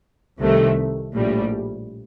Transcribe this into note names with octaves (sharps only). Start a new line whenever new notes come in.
C2 C3 D#3 A3
A#1 A2 G3